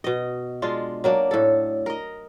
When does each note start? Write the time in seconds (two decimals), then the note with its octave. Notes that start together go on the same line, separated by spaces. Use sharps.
0.04 B2 D#5
0.62 G#3 D4 F4
1.04 F#3 A#3 D4
1.31 A2 A4
1.86 A#4 D#5